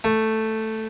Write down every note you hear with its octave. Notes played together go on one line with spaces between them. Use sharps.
A3